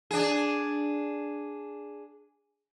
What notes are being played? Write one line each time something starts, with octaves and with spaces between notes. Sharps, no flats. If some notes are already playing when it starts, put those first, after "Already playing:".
D4 G#4